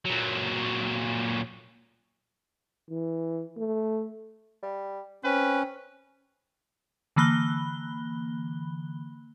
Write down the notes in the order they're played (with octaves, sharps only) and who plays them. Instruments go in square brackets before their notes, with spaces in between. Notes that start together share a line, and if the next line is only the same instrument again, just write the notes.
[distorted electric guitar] A#2 F#3
[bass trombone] E3
A3
[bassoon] G3
[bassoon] C4 [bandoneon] C#4 [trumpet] B4
[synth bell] D3 E3 A#3 B5 F#6 G7